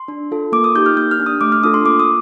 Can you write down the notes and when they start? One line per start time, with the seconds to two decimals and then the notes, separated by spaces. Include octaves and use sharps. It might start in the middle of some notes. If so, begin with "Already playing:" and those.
Already playing: C6
0.08 D4
0.31 F4 A4
0.52 A#3 D6
0.64 D#6
0.75 D#4 G4 G6
0.86 F6
0.97 A#3 G6
1.11 F6
1.19 D4 G4
1.26 D#6
1.41 A3 D6
1.52 F6
1.63 D4 F4 A4 D#6
1.74 C6
1.85 A#3 D6
2.00 D#6